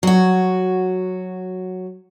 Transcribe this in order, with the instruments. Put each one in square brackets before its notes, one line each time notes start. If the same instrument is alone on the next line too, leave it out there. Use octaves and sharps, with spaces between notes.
[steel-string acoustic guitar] F#3 F#4